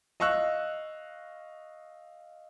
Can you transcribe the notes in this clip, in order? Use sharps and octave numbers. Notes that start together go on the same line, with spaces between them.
D#5 F5 C#6 E6 F#6